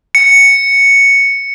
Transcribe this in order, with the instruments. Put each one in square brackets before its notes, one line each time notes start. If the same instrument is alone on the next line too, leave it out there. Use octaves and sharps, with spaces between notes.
[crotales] C#7